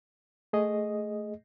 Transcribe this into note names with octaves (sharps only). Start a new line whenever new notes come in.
A3 G#4 D#5